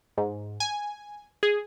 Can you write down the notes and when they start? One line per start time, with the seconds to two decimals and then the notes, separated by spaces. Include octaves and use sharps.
0.17 G#2
0.60 G#5
1.43 G#4